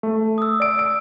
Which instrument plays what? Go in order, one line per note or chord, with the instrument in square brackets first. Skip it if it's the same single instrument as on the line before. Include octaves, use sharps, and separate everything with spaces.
[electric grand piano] A3
[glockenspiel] D#6 E6
[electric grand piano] D5 D7
D7